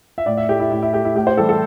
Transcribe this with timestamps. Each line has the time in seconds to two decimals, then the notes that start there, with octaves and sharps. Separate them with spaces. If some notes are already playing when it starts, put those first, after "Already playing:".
0.18 E5
0.26 A2 D5
0.37 E5
0.49 A3 E4 G4
0.60 E4
0.71 A2 E4
0.82 E4
0.93 A3 E4 G4
1.05 E4
1.16 A2 G4
1.27 C5
1.37 E3 G3 E4 A4
1.49 A4